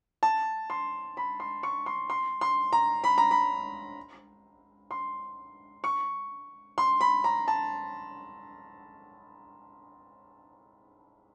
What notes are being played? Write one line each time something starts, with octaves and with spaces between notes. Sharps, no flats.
A5
C6
B5
C6
C#6
C6
C6
C6
A#5
B5
A#5
B5
C6
C#6
C6
B5
A#5
A5